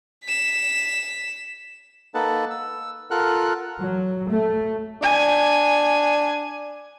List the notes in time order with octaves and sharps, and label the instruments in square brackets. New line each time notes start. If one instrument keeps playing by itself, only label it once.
[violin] B6 E7
[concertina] A#3 D#4 A4 B4 F#5 A5
E6
F4 A4 A#4 F#5 F6 F#6
[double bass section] F#3
A3
[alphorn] D4 [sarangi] G#5